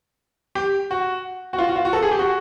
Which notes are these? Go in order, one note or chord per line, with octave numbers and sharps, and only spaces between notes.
G4
F#4
F#4
F4
F#4
F4
F#4
A4
G#4
G4
F#4